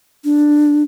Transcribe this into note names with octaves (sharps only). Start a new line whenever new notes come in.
D4